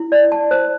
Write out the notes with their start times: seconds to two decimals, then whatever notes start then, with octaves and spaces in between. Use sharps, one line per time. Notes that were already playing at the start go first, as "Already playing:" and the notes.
Already playing: E4
0.12 D5
0.32 A5
0.51 C5